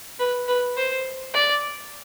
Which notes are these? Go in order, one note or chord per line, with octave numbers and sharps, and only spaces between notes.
B4
B4
C5
D5